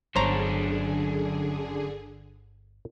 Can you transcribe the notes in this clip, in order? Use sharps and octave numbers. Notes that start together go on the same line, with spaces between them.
G1 F#2 D3 D4 G#4 C5 C#5 A#5